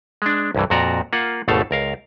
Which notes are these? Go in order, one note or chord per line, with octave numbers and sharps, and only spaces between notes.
G#3 D4
C2 G2 E3
F2 A#2 F#4 D5 A#5
A#3 F4 F#5
G#1 D#2 B2 A3 A4 F5
C#2 A#4 F5